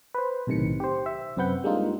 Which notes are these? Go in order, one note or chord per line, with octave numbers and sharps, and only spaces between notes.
B4 C5
B1 A2 C3 D#3 C#7
G4 C5
E5
F#2 C3 C4 B4 F#5 G6
G3 G#3 A#3 D4 D#4 F4